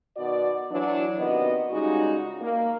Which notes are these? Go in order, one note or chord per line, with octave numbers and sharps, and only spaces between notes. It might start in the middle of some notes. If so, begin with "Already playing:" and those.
B2 D#3 F#4 D5
E3 F#3 D4
C3 D#3 B3 F#4 D#5
C#3 G3 G#3 D#4 F4 F#4
A#3